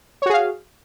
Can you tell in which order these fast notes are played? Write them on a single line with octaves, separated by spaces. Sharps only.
C#5 F#4 G#4 F5